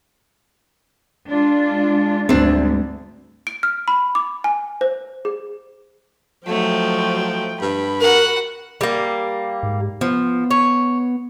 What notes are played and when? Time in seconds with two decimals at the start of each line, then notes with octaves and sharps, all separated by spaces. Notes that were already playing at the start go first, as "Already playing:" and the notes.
1.27 G#3 D4 F4
2.29 D2 G#2 G3 C4 D4
3.47 D7
3.63 F6
3.88 B5
4.15 D6
4.44 G#5
4.81 C5
5.25 G#4
6.47 F3 F#3 A3 D#4 G5
7.62 G2 B5
8.01 F#4 A#4 F#5
8.81 G3 A#3
9.63 G#2
10.01 F3 B3
10.51 C#5